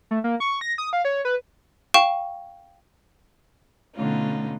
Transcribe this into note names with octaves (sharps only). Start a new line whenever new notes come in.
A3
A#3
C#6
A#6
D#6
F5
C#5
B4
F5 G5 C#6 E7
B2 D3 A3 C#4 D#4 F4